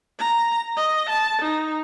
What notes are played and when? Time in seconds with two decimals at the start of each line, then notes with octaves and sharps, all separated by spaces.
0.19 A#5
0.77 D#5
1.09 A5
1.42 D#4